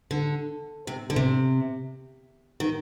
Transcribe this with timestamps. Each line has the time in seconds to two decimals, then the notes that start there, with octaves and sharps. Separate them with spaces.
0.11 D3
0.87 C3
1.10 D3
1.16 C3
2.60 D#3